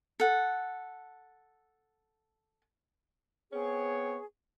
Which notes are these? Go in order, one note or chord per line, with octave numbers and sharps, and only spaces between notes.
A4 F#5
B3 C4 G#4 C#5